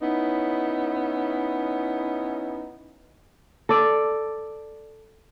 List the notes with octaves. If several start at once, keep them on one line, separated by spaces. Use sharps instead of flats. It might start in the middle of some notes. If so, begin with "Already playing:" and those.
B3 C#4 D#4 E4
A4 D5